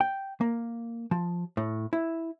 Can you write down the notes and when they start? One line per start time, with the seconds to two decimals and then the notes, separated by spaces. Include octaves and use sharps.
0.01 G5
0.41 A#3
1.11 F3
1.57 A2
1.93 E4